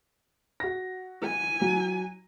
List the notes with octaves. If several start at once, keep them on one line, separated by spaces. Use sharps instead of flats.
F#4 A#6
G#5
F#3